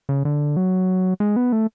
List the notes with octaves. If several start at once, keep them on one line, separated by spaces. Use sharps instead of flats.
C#3
D3
F#3
G#3
B3
A3